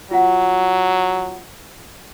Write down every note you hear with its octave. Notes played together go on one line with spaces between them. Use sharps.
F#3 F4 F#5